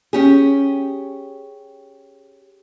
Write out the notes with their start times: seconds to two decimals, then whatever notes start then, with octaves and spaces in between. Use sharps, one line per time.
0.13 C#4 G4 G#4